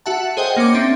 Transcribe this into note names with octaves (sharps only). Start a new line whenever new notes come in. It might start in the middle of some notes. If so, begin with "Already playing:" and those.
F#4 E5 F#5 A5
G#4 C5 D#5 F#5 G5
A#3 C#4 C6 D6
C4 D4 E5